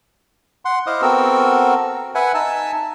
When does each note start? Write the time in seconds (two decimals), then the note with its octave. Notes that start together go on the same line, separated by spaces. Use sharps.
0.65 F#5 C6
0.87 E4 C5 D#5 F5 D6 D#6
1.02 B3 C4 F#4 A4 A#4 E6
2.15 B4 E5 F#5 G#5
2.34 D#4 E5 G#5 A5 E6